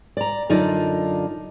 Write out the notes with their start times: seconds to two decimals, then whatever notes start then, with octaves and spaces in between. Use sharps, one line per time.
0.17 D5 A#5
0.50 F#2 D3 D#4 F4 D5 A5